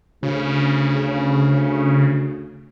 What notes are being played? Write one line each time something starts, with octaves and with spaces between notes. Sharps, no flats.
D2 C#3